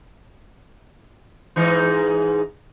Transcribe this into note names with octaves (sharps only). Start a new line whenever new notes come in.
G#2 E3 D#4